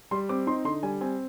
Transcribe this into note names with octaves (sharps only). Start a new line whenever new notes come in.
G3 C6
C4 D6
D#4 C6
D3 C6
G3 G#5
C4 G#5